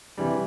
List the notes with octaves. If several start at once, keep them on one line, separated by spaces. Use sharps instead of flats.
C3 E3 G3